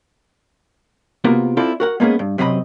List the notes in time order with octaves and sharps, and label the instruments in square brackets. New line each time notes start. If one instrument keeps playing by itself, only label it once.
[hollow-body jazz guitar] C3 A#3 B3 F4 F#4 A#4
C4 E4 F4 A4 D5
F#4 A#4 F#5
G#3 A#3 B3 C#4 G#4
G2
F#2 C3 F#3 C4 D#5 B5